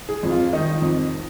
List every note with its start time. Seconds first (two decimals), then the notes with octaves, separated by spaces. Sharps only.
0.09 G#4
0.23 F2
0.31 F4
0.53 D#3 D#4
0.82 F2